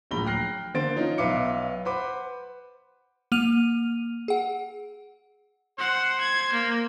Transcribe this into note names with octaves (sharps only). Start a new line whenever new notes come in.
D1 A#1 A#5 B5 G7
G5 F6 F#6 A#6 C7
D3 A#3 C5 A6 D7
F3 C#4 D#4 F4
B1 B4 E5 F5 D6 C#7
B4 C5 F#5 B5 D6
A#3 F6 D#7 F7
G#4 F#5
C5 F#5
G#6
A#3